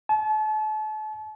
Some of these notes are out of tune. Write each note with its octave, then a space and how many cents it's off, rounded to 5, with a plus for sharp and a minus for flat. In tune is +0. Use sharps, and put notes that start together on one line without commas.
A5 -35